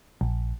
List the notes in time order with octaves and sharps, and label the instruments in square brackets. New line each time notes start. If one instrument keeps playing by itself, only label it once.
[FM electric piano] A#1